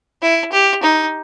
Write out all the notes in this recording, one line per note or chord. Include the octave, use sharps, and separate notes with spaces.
E4
G4
D#4